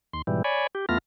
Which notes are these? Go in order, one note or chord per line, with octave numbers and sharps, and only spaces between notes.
D#2 C6
G#2 B2 E3 G3
C#5 D5 G#5 B5
G4
E2 A3 B3 F4 F6 A#6